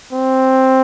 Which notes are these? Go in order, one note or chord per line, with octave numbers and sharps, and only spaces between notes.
C4